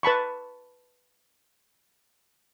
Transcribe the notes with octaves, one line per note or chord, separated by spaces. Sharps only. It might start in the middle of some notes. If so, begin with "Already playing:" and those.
B4 A5 B5 C#6